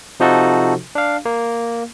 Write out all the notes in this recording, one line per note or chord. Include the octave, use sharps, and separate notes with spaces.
C3 F3 D#4 F#4 A4
D4 F5
A#3